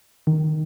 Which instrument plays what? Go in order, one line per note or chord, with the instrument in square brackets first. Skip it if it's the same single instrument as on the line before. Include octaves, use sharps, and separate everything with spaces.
[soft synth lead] D#3